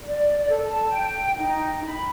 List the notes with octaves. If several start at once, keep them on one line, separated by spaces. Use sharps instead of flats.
D5
D5
A4
A5
G5
D#4
B5